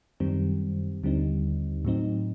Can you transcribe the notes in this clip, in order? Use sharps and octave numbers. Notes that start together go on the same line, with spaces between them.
F#2 D#3 G3 C4
D#2 D3 G3 C4 D#4
A2 F#3 C4 D#4